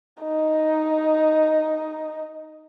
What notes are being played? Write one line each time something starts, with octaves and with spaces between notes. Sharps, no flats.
D#4 D#5